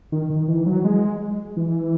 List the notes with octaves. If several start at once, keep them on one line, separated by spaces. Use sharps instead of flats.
D#3
D#3
E3
F#3
G#3
E3